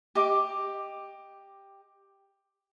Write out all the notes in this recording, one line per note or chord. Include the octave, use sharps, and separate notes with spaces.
G4 D#5 D6